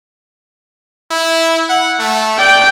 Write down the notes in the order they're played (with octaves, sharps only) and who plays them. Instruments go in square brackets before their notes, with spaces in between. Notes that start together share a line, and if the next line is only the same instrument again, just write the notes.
[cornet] E4
F#5
A3
[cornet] D5 [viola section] G5